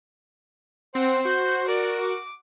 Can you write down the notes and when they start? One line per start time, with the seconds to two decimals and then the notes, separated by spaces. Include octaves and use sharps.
0.95 C4 C5 F#5
1.25 F#4 G6
1.68 A#4 D5
2.01 D6